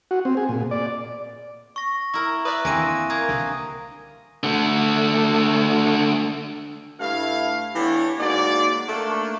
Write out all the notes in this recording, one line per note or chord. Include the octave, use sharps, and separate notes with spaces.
F#4
C4
G#4
A#2
D5
C#6 A#6
E4 A#4
B4 D5 E5 D#6 F#6
D#2 D3 E3 A#3 C4 G#5 A#6 D#7
A#3 D#6 G#6
C2 D3
D3 A3
G2 A3 E4 F5
E3 B3 D4 G4 A4 C#5
G#2 A#3 F#4 D5
A3 A#3 D4